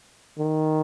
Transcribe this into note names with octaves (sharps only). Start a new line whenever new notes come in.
D#3